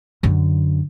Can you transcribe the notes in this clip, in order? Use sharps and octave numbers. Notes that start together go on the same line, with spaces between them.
F#2 D3